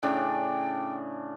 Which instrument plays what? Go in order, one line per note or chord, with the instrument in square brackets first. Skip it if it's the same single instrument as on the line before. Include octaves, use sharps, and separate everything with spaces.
[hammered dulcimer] A2 C#3 D4 [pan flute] G5